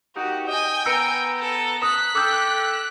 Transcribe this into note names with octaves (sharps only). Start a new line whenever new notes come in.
A#3 D#4 F#4 G4
D#5 G5 G#5
B3 A#5 E6 C#7 D7
A4
D#6 F#6 B6
A4 G5 D6 E6 G6